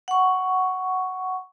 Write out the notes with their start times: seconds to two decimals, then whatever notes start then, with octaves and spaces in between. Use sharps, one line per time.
0.08 F#5 C#6